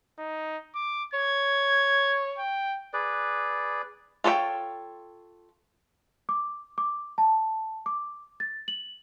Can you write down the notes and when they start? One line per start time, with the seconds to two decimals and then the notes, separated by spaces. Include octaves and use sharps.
0.19 D#4
0.75 D6
1.14 C#5 G#6
2.39 G5
2.93 G#4 B4 D5
4.24 F4 A4 C#5 D#5 G5
6.29 D6
6.78 D6
7.18 A5
7.86 D6
8.40 A6
8.68 F#7